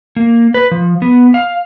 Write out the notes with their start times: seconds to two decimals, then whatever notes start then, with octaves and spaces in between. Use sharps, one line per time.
0.16 A#3
0.54 B4
0.71 F3
1.02 B3
1.34 F5